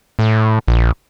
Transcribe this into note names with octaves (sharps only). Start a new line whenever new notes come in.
A2
A#1